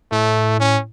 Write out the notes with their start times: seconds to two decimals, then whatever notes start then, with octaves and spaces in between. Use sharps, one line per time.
0.12 A2 A3
0.60 C#4